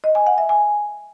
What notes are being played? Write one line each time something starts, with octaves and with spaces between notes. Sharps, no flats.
D#5
G#5
F#5
E5
G#5